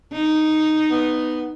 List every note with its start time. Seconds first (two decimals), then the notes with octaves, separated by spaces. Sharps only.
0.12 D#4
0.91 B3